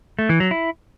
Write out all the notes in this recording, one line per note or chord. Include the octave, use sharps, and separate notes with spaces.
A3
E3
F#3
E4